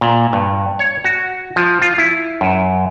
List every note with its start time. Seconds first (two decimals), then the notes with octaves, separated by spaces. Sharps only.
0.01 A#2
0.33 G2
0.79 C#5
1.04 F#4
1.56 F3
1.82 F4
1.98 E4
2.41 F#2